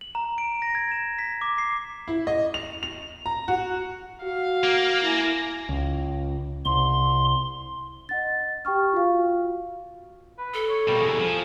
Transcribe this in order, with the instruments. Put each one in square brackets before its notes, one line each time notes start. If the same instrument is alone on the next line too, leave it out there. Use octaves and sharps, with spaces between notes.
[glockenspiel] F#7
A#5
D7
A#6
G#6
E7
B6
D6
C7
[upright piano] E4
D#5
F7
F7
A#5
F#4
[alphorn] F#4 [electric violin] F5
[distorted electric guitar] A#3
[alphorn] E4 [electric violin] G#5 A#6
[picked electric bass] C#2
[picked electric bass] C2 [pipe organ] C6
[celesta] D#5 F#5 A6
G4 G5 C#6 F6
F4 F#4 F5
[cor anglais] B4
[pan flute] A4
[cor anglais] C#5
[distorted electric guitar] B2 A#3 [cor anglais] G3
[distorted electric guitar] E2 C3 [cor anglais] G#4
[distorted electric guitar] F3